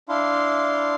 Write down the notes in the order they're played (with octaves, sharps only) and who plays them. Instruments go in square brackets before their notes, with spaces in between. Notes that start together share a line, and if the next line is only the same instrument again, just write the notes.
[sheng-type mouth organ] D4 E4 F5 C6